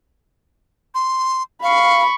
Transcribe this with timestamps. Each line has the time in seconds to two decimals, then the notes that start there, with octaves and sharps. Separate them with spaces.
0.94 C6
1.62 F5 B5 C#6